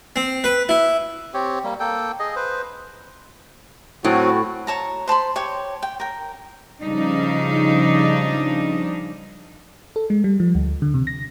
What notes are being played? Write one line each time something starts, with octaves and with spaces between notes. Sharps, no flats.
C4
B4
E4
C4 G4 C#5
G3 A#3
A#3 A4 G5
G#4 D#5
B4 C5
A2 F#3 C4 F#4
C#5 A5 A#5
C5 A5 B5 C6
G4 C#5
G5
A#4 G5
C#3 F3 G3 D4 D#4
A4
G#3
G3
F3
D2
D3
C3
A#6